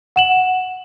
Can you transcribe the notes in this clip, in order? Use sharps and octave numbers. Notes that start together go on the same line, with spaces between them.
F#5 E7 F#7